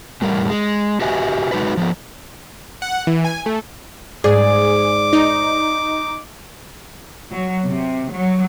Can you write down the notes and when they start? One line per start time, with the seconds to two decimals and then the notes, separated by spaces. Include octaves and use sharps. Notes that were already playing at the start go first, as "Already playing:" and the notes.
0.22 E2 A2 G3 A#4
0.49 G#3
1.01 F#4 G4 B4 D#5 E5 G#5
1.52 G#3 D#4 F#4 B4
1.77 F3 A#3 B3
2.82 F#5
3.07 E3
3.25 G#5
3.46 A3
4.24 G#2 G#4 D5 D6
5.13 D#4
7.31 F#3
7.66 C3
8.12 F#3